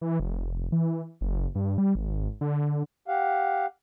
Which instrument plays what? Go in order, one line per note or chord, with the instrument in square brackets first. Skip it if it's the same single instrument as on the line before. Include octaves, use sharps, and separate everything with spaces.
[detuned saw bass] E3
F1
E3
F#1
G2
G3
G#1
D3
[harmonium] G4 F5 F#5